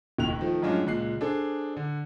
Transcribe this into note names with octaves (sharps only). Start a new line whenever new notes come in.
F1 D#2 F#6 F7
D#3 F3 A3
F#2 A2 G#3 C#4 D4 F4
C#2 A#2 F#6 C7
D4 G#4 A4 C5
D3